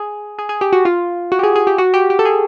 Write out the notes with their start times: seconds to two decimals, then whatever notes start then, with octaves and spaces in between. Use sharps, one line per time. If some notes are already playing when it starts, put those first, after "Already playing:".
Already playing: G#4
0.39 G#4
0.49 G#4
0.61 G4
0.73 F#4
0.85 F4
1.32 F#4
1.39 G4
1.43 G#4
1.56 G#4
1.67 G4
1.78 F#4
1.94 G4
2.10 G4
2.19 A4
2.25 G#4